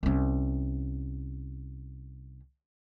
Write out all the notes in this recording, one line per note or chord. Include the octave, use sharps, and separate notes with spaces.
C2 C#4